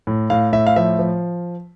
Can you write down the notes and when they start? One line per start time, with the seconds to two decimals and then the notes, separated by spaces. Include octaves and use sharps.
0.07 A2
0.30 A2 F5
0.53 A2 E5
0.67 F5
0.76 F3 E5
0.99 F3